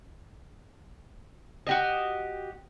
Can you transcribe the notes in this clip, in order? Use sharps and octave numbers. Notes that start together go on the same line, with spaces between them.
F#4 G4 D#5